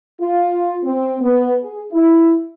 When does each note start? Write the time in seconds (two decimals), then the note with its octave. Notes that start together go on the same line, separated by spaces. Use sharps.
0.21 F4
0.84 C4
1.20 B3
1.62 G#4
1.92 E4